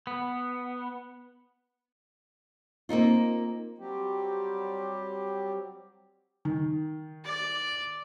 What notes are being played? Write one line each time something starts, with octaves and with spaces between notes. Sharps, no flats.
B3
A#3 C4 D#4 F4
F#3 G3 C4 G4
D#3
D5